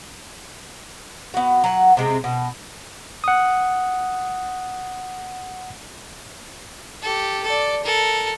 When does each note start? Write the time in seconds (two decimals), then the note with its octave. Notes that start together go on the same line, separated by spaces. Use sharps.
1.34 B3 F#4
1.64 F#3 F#5
1.97 C3 G#3 C4
2.24 B2
3.24 F#5 D#6
7.02 G4 A4
7.44 A4 D5
7.84 A4 A#4